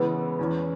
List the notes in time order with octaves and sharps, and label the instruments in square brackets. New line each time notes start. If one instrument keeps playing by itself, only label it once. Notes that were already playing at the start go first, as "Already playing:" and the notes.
Already playing: [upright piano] C#3 E3 G#3 B3 [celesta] B4
[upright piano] E2 E3 C#4